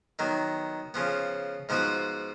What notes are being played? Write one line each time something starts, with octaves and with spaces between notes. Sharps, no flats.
D#3 F#3 B3
C#3 F3 B3
G#2 F3 B3 F#4